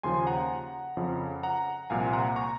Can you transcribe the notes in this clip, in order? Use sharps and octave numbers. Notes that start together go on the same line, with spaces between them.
D#2 C#3 F3 G#5 C6
F#5 A#5
F2 C#3 F3
F#5 A#5
C2 A#2 F3 F5 G#5
C6
F#5 A#5
A#5 C#6